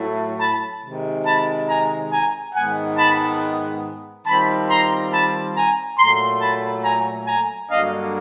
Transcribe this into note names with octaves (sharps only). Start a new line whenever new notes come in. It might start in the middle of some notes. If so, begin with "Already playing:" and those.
Already playing: A2 F#3 A3
A5 B5
C3 D#3 G#3
A5 B5
G#5 A#5
G#5 A#5
G#2 D#3 G#3 B3 F#5 G#5
A5 B5
D#3 G3 C4 F4 A5 B5
A#5 C6
A5 B5
G#5 A#5
A#2 F#3 A3 A#5 C6
A5 B5
G#5 A#5
G#5 A#5
G2 D3 F#3 A#3 D4 D#5 F5